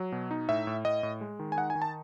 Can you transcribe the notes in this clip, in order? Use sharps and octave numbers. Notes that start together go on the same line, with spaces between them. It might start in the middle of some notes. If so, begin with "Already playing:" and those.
Already playing: F#3
B2
D#4
A2 E5
A2
A2 D#5
A2
G#3
D#3
G#5
D#4 F#5
G#5
D#3
A5